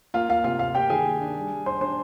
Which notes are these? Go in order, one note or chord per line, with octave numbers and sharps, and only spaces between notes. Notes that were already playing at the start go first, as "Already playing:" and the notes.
A#3 F4 F5
A#3 F4 F5
C3 F4 F5
F4 F5
A#3 G4 G5
D#3 G#4 G#5
A#3
D4
G3
G3
D4 C5 C6
D4 C5 C6